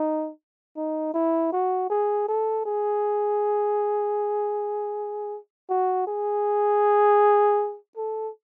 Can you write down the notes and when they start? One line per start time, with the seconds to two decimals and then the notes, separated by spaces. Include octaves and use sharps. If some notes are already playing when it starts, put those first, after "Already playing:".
Already playing: D#4
0.77 D#4
1.14 E4
1.52 F#4
1.90 G#4
2.28 A4
2.66 G#4
5.70 F#4
6.07 G#4
7.97 A4